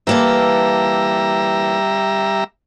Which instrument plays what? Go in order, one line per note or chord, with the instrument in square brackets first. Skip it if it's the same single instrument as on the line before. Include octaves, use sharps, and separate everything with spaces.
[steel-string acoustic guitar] E3 A#3 A4 [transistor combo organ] G3 E5 A#5